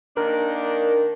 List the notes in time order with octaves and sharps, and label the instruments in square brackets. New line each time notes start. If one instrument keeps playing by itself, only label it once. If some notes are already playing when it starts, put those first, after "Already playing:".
[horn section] D#3 A#3 D4 [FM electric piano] A#4